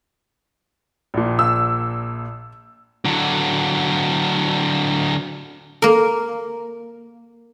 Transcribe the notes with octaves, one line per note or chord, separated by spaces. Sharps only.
A#1 A#2
E6
D3 F#3
A#3 A#4